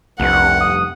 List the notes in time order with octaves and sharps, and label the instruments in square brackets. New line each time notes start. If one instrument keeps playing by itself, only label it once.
[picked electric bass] F1 G2 [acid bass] C2 [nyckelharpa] F#5
[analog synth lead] D#6